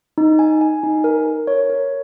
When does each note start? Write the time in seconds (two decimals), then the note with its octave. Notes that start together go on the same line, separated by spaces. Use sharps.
0.18 D#4
0.39 G#5
0.61 G#5
0.83 D#4
1.04 A#4
1.26 A#4
1.47 C#5
1.70 A#4